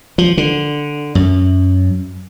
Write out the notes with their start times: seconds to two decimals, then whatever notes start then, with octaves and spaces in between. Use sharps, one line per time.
0.18 F3
0.37 D3
1.15 F#2